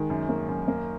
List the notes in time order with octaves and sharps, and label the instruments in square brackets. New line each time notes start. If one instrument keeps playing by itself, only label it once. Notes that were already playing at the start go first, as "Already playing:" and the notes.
Already playing: [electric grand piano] D#3 [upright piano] G#3
[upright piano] F#2
A#3
F#2
A#3